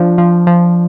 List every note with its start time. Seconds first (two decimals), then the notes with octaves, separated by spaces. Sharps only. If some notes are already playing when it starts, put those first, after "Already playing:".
Already playing: F3 D4
0.18 F3
0.47 F3